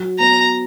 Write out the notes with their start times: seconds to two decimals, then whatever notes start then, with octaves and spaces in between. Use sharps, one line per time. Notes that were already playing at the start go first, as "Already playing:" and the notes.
Already playing: F#3
0.19 B3 A#5